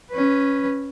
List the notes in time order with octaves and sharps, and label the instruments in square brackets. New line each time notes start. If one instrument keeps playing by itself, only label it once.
[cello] C#4 B4